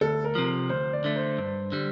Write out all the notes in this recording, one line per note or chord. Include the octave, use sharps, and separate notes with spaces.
D2 A4
A#4
C3 F3
D2 C5
D5
D3 A3
C5
G2
D3 G3